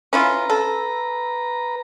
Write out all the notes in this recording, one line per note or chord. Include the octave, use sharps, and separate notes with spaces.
C#4 E4 F4 B4 A#5
A4